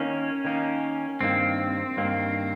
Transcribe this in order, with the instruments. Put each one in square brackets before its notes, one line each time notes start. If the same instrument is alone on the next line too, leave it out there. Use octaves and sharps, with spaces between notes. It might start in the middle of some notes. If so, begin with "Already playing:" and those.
Already playing: [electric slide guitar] D#3 A#3 D#4 [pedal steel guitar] C#4
[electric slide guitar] D#3 A#3 D#4
[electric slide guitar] G2 D#3 A#3 [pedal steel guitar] C4
[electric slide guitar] G2 D#3 A#3